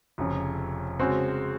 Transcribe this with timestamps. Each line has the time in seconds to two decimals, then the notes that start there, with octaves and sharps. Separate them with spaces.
0.18 F1 F2 C#3
0.99 C#3 G#3 C4 F#4